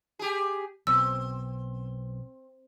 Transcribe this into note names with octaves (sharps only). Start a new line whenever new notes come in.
G4 G#4
B1 C4 E6